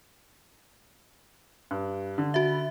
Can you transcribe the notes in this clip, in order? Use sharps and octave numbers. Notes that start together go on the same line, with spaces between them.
G2
D3
F#4 E5